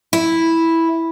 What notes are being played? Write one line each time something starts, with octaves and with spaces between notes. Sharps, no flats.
E4